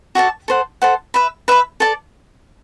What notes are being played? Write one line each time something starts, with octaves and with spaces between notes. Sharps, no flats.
F#4 A4 D5 A5
A4 C5 F#5
A4 C5 F#5
B4 E5 B5
B4 E5 B5
A4 D5 A5